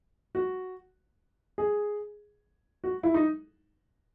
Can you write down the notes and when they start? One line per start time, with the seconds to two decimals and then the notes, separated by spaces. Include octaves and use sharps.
0.35 F#4
1.58 G#4
2.84 F#4
3.03 E4
3.14 D#4